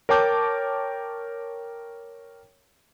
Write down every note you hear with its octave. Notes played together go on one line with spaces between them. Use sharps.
A#4 C#5 G5 A5 D6 G6